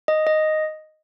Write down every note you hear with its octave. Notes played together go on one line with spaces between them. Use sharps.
D#5
D#5